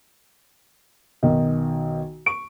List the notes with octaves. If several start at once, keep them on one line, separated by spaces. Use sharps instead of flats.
B1 D#3 D#5
C#6 D7